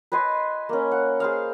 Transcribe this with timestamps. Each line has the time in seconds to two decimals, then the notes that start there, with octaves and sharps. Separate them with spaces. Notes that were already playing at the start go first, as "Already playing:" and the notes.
0.12 B4 D#5 G#5 C6
0.69 A#3 C#4
0.92 F#5
1.20 G#4 C5 F5